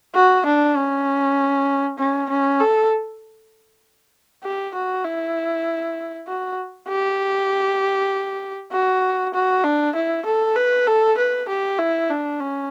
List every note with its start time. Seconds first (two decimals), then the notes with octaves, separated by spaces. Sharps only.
0.15 F#4
0.46 D4
0.76 C#4
1.99 C#4
2.30 C#4
2.60 A4
4.44 G4
4.74 F#4
5.05 E4
6.28 F#4
6.89 G4
8.72 F#4
9.34 F#4
9.64 D4
9.96 E4
10.26 A4
10.56 B4
10.87 A4
11.18 B4
11.49 G4
11.79 E4
12.10 D4
12.40 C#4